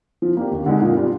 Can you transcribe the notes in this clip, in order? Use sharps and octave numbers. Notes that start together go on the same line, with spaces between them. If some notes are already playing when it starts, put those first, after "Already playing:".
F3
A#3 D4 G4
D#2
D3 G#3 D#4
A#2
G3 D4 F4